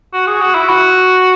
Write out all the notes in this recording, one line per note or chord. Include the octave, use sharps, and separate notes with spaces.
F#4
G#4
F#4
E4
F#4